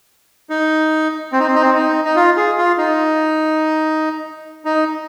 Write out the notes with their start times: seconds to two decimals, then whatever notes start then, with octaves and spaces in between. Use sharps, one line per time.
0.50 D#4
1.32 C4
1.40 D#4
1.48 C4
1.55 D#4
1.62 C4
1.74 D#4
2.05 D#4
2.16 F4
2.37 G#4
2.58 F4
2.78 D#4
4.65 D#4